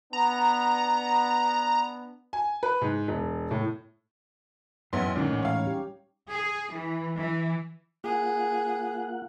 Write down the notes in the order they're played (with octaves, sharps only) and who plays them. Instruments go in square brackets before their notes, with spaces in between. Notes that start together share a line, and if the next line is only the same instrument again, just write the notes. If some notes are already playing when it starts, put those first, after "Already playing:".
[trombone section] B3 D4 [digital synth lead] A#5
[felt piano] G#5
B4
G#2
E1
A2
[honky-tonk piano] A1 B3 C6 [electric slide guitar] F#2 C#5 E5
[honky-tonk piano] D2 A#2 [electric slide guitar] D3 F#3 G#3 [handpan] C#4 D#4
[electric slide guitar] A2 E3 G#3
[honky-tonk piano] C#5 F5
[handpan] G3 G4
[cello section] G#4
E3
E3
[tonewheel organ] A#3 F4 F#5 [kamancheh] G#4